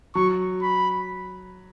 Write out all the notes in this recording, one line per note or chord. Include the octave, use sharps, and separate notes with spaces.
F#3 C#6
B5